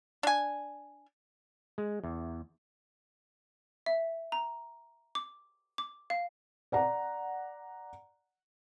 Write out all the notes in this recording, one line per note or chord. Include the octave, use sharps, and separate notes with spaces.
D4 G#5
G#3
E2
E5
A#5
D6
D6
F5
D5 F#5 A#5